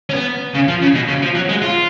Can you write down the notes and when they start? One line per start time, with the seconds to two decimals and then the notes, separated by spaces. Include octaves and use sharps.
0.10 C#4
0.14 B3
0.55 C#3
0.68 F3
0.82 C#3
0.94 B2
1.08 C#3
1.22 F3
1.35 F#3
1.49 G#3
1.62 F4